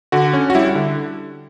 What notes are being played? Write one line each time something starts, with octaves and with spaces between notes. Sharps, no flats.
D3 F#4
C#4
F#4
G3 E4
D3